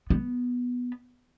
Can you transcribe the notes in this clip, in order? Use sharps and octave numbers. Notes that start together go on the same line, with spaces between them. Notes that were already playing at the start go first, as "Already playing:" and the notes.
B3